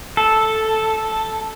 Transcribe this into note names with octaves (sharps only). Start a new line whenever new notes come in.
A4